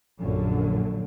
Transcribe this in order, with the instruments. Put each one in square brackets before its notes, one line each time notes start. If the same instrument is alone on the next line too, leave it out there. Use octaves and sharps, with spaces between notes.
[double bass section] A#1 F#2 D3